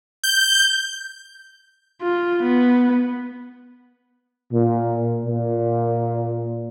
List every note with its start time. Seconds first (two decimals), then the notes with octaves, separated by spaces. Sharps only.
0.24 G6
2.02 F4
2.43 B3
4.52 A#2
5.24 A#2